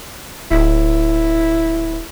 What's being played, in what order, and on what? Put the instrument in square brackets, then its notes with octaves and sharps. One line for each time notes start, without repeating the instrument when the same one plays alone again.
[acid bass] D1 [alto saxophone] E4